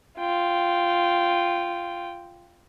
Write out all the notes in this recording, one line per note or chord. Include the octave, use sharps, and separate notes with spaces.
F4 G5